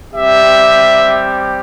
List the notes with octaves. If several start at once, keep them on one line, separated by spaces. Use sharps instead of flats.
G3 C4 G4 E5